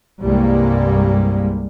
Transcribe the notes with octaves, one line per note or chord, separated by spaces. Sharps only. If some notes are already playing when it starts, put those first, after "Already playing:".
C2 G2 G3 G#3 A#3